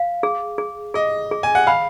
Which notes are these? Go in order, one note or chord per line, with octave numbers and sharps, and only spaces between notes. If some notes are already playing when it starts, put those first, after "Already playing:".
Already playing: F5
G#4
G#4
G#4 D#5
G#4
G#5
F#5
F5 B5